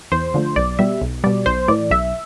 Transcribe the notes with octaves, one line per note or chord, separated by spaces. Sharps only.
E2 C5
D3 F3 A3
B1 D5
B2 G3 E5
B1
B2 G3 D5
B1 C5
A2 E3 D5
B1 E5